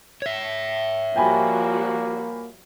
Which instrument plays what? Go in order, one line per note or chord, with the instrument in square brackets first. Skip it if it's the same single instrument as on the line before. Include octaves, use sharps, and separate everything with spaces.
[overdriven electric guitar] C#5 E5
[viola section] F3 G3 F#4 [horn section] A#3 [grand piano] G5 G#5 B5